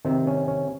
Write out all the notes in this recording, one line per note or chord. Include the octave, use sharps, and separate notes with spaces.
C3 D#3 C4
C#4
C#4